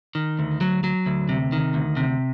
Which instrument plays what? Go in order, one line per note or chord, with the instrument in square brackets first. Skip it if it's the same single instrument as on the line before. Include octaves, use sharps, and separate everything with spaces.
[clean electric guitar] D#3
D2
F#3
F#3
D2
C3
D#3
D2
C3